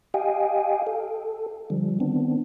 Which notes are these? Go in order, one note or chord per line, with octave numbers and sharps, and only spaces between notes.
G4 D#5 F5 G5 G#5
A4
D3 F3 G3
D#3 B3 C4 D4